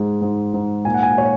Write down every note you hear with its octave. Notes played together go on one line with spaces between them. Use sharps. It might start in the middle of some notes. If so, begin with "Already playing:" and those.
Already playing: G#2 G#3
G#2
G#2
A#2 G#5
F#5
G#5
A#2 C#5